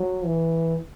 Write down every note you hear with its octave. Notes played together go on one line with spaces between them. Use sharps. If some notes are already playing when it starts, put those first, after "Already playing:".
Already playing: F#3
E3